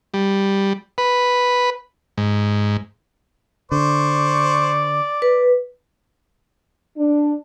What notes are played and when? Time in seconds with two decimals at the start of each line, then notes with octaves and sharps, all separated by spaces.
0.14 G3
0.98 B4
2.18 G#2
3.72 D3 C5 D5 C#6
5.22 B4
6.98 D4